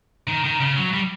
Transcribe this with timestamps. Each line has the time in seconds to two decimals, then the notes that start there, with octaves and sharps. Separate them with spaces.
0.28 D#3
0.44 D#3
0.61 C#3
0.76 F#3
0.93 G3